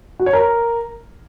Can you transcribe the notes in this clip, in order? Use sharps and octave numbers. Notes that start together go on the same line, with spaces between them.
F#4
C#5
A#4